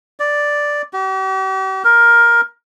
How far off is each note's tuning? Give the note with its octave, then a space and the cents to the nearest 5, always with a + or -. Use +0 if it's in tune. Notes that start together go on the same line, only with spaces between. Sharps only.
D5 +0
G4 -45
A#4 +10